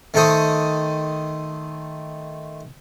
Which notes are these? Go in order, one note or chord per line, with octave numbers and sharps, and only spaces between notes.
D#3 A3 A4 C5 D#6